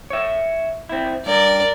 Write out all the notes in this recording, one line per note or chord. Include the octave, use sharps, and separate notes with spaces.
C#5 E5
C4 E4
G2 A#4 D5